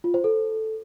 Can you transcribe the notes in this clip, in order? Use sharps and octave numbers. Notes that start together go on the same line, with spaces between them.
F4
C5
A4